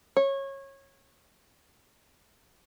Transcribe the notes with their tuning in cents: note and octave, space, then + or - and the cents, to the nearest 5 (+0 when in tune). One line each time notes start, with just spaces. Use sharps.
C#5 -20